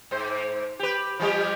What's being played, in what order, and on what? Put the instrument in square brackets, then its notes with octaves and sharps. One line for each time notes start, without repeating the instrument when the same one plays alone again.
[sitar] G#2 C5
G4 B4
F3 G3 G4